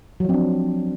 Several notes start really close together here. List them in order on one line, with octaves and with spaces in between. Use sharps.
F#3 F3 C4 D4